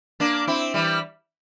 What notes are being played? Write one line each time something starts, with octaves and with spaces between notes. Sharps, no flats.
A#3 D4
C4 E4
E3 G3